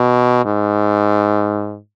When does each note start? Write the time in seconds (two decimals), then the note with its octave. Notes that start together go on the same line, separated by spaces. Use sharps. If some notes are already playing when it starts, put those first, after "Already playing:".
Already playing: B2
0.45 G#2